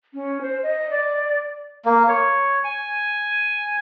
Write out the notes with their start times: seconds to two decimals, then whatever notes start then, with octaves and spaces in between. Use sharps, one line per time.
0.14 C#4
0.41 C5
0.63 D#5
0.90 D5
1.85 A#3
2.09 C#5
2.64 G#5